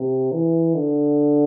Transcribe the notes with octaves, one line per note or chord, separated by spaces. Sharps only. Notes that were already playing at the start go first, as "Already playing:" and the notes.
Already playing: C3
E3
D3